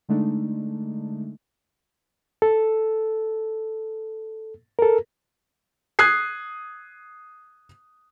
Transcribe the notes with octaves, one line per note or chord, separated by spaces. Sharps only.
D3 G#3 A3 D4 D#4
A4
A4 A#4
D#6 F#6 G#6 C7